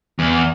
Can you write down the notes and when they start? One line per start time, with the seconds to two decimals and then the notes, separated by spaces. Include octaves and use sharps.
0.19 E2